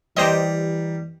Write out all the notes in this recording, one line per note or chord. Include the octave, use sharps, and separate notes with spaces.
E3 G3 G4 C5 D#5 A#5